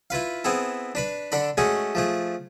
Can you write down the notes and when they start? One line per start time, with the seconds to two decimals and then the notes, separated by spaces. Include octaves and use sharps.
0.10 E4 F4 B4 F5
0.44 B3 C4 E4 G#4 A4
0.95 D4 B4 B5
1.32 D3 D4 A4 D5 B5
1.57 G#3 A3 C#4 F#4 G#4 A4
1.95 F3 A3 G#4